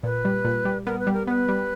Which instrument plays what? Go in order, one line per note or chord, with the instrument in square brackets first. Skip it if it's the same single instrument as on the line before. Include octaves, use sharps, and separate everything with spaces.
[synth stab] A#2 [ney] B4
[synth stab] G3
A#2
G3
[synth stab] B3 [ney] A#4
[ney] B4
[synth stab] G3
[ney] A#4
[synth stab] B3 [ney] B4
[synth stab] G3